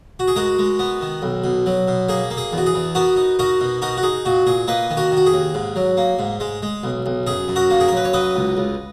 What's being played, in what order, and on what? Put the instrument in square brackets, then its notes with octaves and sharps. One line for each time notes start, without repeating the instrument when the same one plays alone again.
[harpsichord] F#4
G#4
G#3 F#4 A#4
G#3
B3
D#3
B1
B2
F#3
B2
A#3 G#4
A#3
G#4
E2
F#4
G#4
E2
B3 F#4 A#4
D#4
D#4 F#4 A#4
B2
D#4 F#4 A#4
F#4
D#4 G#4
A#2 F#4
A#2 G#4
A#3 B4 D#5
D#3
F#4 A#4
D#3
F#4
G#4
D#2
G#2
F#3
A#3
G#2
G#3
G#3
B1
B1
F#2 G#4
F#2
F#4 A#4
A#3
G#4
A#4
F#2 B4
C#5
F#3 B4 D#5
C#2
C#2